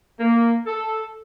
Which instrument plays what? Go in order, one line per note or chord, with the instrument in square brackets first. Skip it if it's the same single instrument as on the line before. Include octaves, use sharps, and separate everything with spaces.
[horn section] A#3
A4